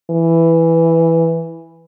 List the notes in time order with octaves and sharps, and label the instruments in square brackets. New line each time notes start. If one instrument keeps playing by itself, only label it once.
[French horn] E3